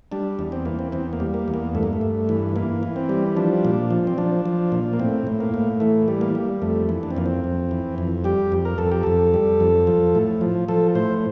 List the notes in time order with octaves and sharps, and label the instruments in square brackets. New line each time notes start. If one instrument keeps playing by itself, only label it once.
[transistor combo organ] G3 D4
E2
C4
E3 A#3
C4
E2 C4
A#3
G3
A#3
E2
A#3
G2 A3
A#3
A3
G2
E3
E3 A#3
E3
C4
G3
F3 D4
A#2
F3
C4
F3 D4
F3
A#2
A#3
A2 C4
A2
A#3
A2
E3 A3
G3
A#3
G3
F2 A3
E3
D4
C4
F2 A#3
C4
F2
E3
F2
G3 G4
F2
A#4
F2 A4
G4
F2 A4
G3
F2
F3
A2
F3
F3 A4
A2 C5